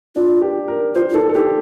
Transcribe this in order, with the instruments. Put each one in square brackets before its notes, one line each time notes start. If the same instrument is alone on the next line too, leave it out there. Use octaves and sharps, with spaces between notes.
[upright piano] D4 [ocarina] F4
[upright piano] G4
A#4
[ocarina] F4 [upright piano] C5
[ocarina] F4
[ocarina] D#4 [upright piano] A4
[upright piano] A4
[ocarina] D#4 [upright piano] G4